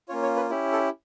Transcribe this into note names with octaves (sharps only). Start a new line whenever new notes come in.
A#3 C#4 F4 C#5
C#5
B4
C#4 E4 G4
A4